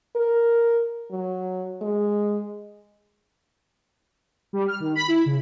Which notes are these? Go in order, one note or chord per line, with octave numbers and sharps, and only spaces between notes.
A#4
F#3
G#3
G3
F6
D#3
B5
E4
C#3